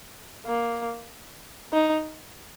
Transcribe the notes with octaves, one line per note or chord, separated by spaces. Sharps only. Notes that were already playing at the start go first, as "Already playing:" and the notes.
A#3
D#4